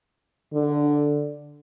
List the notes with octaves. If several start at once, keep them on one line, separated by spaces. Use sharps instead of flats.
D3